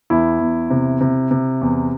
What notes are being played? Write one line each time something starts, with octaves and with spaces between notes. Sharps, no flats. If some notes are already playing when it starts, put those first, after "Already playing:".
E2 E4
E2
C3
C3
C3
E2